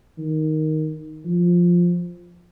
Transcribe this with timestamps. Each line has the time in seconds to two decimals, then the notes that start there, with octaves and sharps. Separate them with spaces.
0.18 D#3
1.25 F3